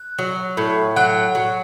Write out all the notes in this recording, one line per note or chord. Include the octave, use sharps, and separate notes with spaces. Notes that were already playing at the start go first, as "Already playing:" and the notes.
Already playing: F#6
F#3
A2
F#3 F#5 F#6
F#3